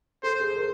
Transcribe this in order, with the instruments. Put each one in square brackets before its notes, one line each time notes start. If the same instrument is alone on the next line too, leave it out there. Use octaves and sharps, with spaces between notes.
[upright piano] A4 [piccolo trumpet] C5
[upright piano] G#4
A#4